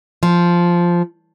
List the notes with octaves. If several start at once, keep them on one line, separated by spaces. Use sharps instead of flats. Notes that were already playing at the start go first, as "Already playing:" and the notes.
F3